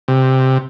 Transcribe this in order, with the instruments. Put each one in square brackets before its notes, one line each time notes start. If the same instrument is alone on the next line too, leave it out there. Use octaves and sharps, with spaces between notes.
[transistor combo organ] C3